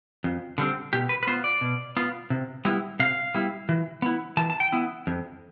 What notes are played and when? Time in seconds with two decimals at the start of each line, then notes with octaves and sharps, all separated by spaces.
0.24 F2
0.58 D3 G3 C4
0.93 B2 G4
1.09 B4
1.23 B4
1.27 B3 F4 C5
1.44 D5
1.61 B2
1.97 B3 F4
2.30 C3
2.65 G3 B3 E4
2.99 C3 F5
3.34 G3 B3 E4
3.69 E3
4.02 B3 E4
4.37 E3 A5
4.50 A5
4.60 G5
4.72 B3 E4
5.07 F2